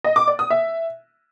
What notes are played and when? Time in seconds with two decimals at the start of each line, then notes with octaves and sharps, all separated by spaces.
0.04 D#5
0.16 D6
0.27 D5
0.39 D#6
0.50 E5